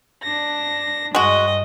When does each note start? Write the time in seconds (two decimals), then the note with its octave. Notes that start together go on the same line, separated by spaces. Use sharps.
0.22 D4 A#6
1.15 G2 G#3 F#4 D#5